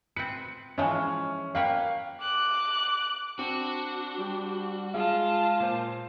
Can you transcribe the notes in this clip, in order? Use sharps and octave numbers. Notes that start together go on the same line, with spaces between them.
C4 B4 C#7
E3 F3 G#3 C#4
A#3 B4 C#5 F5 G5
D6 F#6
C4 D4 F#4
G3
G#3 F4 F5 A5
A#2 C5